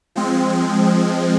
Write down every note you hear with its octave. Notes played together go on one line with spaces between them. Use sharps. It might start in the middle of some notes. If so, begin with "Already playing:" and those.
F3 G#3 C4